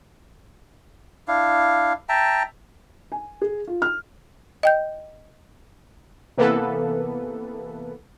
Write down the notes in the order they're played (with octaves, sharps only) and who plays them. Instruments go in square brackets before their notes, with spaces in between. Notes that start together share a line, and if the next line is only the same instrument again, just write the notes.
[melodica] D4 E4 F5
E5 G5 A5 A#5
[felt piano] G#5
G#4
F4
F6
[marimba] D#5 G5 G6
[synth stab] C3 E3 A#3 B3 A4 B4